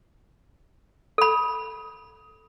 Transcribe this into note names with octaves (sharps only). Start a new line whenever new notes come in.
A4 B5